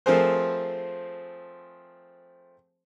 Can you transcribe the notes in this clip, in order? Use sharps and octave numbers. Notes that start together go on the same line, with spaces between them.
F3 A3 C4 G#4 A#4 C5